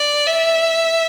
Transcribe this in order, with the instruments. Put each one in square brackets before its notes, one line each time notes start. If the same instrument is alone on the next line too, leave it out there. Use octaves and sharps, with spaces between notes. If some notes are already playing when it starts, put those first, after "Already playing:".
Already playing: [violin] D5
E5